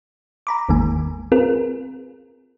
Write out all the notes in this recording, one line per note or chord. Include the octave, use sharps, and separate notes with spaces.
A#5 B5 D6
G#1 E2 D#3 G#3 A#3 G#5
C4 F4 G#4 A#4 B4